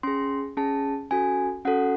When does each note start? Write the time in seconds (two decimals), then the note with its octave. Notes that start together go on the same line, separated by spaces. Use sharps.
0.03 C#4 G#4 C6
0.57 C#4 G#4 A5
1.11 C#4 F#4 A4 G#5
1.65 C#4 F#4 A4 F#5